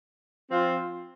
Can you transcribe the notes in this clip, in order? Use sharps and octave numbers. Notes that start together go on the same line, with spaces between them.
F3 C4 F4